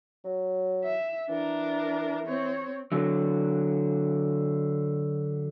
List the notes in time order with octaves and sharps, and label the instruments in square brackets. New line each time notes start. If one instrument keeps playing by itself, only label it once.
[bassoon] F#3
[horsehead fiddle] E5
[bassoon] E3 [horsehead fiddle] D4 A#4
[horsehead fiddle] C4 C#5
[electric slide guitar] D3 F#3